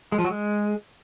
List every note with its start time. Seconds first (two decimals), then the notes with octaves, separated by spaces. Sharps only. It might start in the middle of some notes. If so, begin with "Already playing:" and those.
0.12 G#3
0.18 F3
0.24 F#3
0.31 G#3